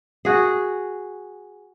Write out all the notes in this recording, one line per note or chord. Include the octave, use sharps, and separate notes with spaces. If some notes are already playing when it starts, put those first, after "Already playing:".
F#4 G#4